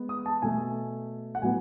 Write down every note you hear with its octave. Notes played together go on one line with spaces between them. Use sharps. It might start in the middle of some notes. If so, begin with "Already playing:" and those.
Already playing: G#3 B3
D#6
A5
B2 A3 G#5
F#5
A2 F#3 B3 G#5